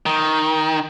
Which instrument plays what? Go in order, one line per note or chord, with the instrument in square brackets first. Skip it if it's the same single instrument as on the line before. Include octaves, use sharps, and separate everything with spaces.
[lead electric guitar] D#3